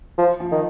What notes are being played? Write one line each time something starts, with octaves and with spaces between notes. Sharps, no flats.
F3
F3
D#3